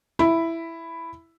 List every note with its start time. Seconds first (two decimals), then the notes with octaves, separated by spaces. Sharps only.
0.19 E4 B5